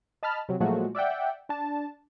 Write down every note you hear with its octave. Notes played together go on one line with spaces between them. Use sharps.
D#5 A5 B5 F6
C3 F#3
A#2 F3 F#3 G#3 A3 F#4
D5 E5 F#5 G5
D4 A5